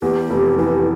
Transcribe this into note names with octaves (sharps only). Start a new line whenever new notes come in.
E2 G4
F1
E3 G4